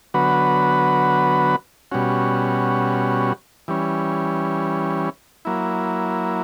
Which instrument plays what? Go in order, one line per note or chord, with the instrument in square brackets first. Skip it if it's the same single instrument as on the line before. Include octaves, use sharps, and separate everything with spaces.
[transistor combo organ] D3 F#3 B3 F#4 B4
B2 G3 C#4 F#4
E3 G3 C#4
F#3 A#3 E4